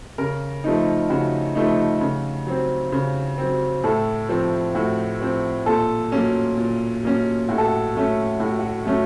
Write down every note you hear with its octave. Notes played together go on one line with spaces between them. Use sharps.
C#3 A#4
F3 A3 D#4
C#3 F#4
F3 A3 D#4
C#3
F#3 C4
C#3
F#3 C4
A2 A4
F3 C4
A2 F#4
F3 C4
A#2 A4
F#3 A#3 C#4
A#2
F#3 A#3 C#4
A2 F#4
A4
F#4
F#3 A3 C#4
A2 F#4
F#4
F#3 A3 C#4